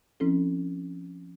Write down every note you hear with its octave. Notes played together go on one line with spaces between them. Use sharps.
F3 C4 C#4 E4 A4